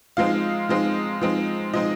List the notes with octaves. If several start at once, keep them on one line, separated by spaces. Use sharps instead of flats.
F3 G#3 C4 D#4 F5
F3 G#3 C4 D#4
F3 G#3 C4 D#4
F3 G#3 C4 D#4 D#5